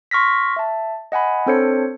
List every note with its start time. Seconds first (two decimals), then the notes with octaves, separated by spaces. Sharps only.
0.11 C6 C#6 F6 A#6 B6
0.56 E5 A5
1.12 D#5 F#5 G#5 B5
1.46 C4 D4 A4 C5 C#5 C#7